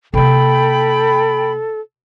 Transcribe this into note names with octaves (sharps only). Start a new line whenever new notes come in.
C3 A#3 A4 G5 B5